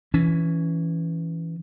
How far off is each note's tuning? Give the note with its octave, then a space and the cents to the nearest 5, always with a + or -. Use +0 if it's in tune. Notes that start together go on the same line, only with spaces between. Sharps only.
E3 +0 C#4 +10